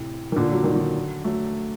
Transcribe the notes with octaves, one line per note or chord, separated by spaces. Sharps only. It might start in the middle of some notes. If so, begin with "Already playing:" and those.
Already playing: A2 C3
D#3
A#2 D3
F#3
D#3
D3 F#3
F#3 A3